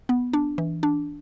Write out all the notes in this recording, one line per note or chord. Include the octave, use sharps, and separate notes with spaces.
B3
D4
E3
D4